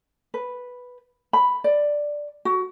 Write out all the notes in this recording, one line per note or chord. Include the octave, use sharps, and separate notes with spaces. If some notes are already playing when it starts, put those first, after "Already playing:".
B4
B5
D5
F#4